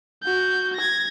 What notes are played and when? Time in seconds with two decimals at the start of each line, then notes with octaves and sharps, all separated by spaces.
0.23 F#4 G6
0.76 G#6 A#6